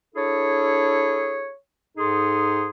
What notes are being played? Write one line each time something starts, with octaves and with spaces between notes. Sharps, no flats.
D4 E4 G#4 A4 C#5
G#2 D#4 G#4 A4 C6